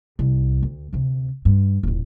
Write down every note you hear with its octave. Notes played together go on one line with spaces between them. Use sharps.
C2
D2
D2 C3
G2
D#1 A1